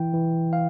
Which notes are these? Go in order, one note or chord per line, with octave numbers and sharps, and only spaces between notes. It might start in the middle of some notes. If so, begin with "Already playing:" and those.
Already playing: E3 E4 G5
E3
F5